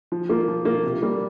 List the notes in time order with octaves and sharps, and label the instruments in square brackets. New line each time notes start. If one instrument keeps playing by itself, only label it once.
[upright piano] F3
A#3 F4
F3
A#3 F4
C3
G3 A#3